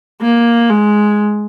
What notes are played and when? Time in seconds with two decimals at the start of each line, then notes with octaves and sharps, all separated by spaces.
0.22 A#3
0.70 G#3